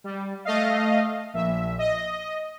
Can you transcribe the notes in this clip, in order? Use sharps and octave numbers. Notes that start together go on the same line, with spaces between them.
G3
A3 D#5 F5
A#1 E5
D#5